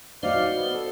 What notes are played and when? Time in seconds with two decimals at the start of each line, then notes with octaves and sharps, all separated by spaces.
0.23 D#4 F#4 C5 D5 F5
0.56 B3
0.74 A4